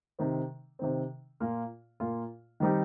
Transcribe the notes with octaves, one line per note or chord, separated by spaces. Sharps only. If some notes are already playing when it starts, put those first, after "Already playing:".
C3 D#3 C4
C3 D#3 C4
A#2 A#3 F4
A#2 A#3 F4
D#3 G3 C4 D#4 G4